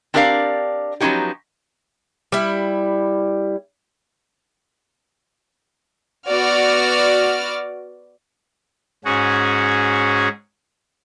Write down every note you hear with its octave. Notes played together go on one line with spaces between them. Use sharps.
C4 D4 G4 A#4 D5 F5
F3 F#3 B3 C#4 D#4 G4
G3 E4
B3 F#4 D5 F6
G#2 C#4 F#4 G#4